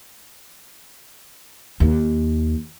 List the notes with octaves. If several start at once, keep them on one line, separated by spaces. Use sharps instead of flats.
D#2